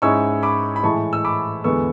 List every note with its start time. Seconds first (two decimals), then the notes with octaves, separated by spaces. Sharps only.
0.02 G#2 G#3 C#4 E4 C#6 E6
0.43 B5 D6
0.76 B5
0.84 A2 E3 G#3 A5 C#6
1.13 E6
1.25 B5 D6
1.64 E2 D3 G#3 B3 C#6 E6